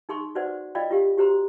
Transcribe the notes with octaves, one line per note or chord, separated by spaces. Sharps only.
D#4 G#4 C6 C#6
F#4 B4 C5 D5 F#5
F4 D5 D#5 F5 G5 B5
F4 G4 F5
F#4 G4 C5 A#5 C6